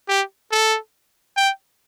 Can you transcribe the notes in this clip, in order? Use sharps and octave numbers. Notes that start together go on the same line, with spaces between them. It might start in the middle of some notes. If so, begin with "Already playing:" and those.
G4
A4
G5